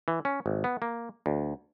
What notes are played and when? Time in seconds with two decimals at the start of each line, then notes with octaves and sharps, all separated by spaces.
0.08 E3
0.25 C#4
0.46 G#1
0.64 B3
0.82 A#3
1.26 D2